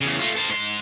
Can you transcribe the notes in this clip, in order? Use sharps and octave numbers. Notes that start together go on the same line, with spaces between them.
E2 C#3
A3 F4
A4 C5
G#2 C6